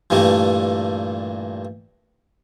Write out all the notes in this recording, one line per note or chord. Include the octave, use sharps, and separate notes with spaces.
G2 A#2 E3 G3 A3